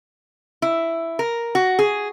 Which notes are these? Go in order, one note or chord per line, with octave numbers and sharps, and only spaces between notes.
E4
A#4
F#4
G#4